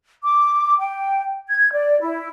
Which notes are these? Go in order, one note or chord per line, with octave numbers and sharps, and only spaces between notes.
D6
G5
G#6
D5
E4